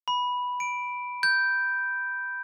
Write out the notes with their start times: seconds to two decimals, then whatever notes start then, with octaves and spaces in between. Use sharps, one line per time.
0.08 B5
0.60 D7
1.23 G6